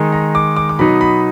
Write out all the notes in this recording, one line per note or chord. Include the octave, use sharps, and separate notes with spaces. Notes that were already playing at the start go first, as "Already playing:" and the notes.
Already playing: D#3 G#3 D#4
A#5
D6
D6
D6
B2 F#3 B3 D#4 B5
B5